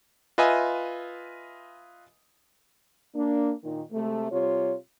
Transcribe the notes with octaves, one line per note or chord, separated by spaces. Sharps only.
F4 B4 D#5 E5 G#5 D#6
A#3 D4
A#2 D#3
C3 G#3 A3
C3 G3 F4 C#5